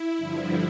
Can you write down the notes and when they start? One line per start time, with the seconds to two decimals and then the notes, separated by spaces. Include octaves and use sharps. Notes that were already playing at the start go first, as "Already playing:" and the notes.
Already playing: E4
0.17 G2 D3 F3